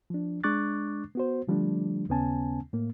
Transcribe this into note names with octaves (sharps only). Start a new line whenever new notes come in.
F3 D4
G#3 D4 C#6 D6 F#6 A6
B3 F#4 C5
D3 F3 G3 A3 D4
D#2 C#3 B3 C#4 G#5 A5
A2 A#3